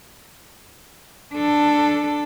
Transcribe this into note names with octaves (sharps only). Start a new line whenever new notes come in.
D4 A4